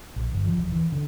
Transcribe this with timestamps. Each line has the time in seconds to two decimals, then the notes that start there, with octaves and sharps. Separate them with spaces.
0.16 A#1
0.33 G1
0.46 F3
0.58 E1
0.72 E3
0.92 D3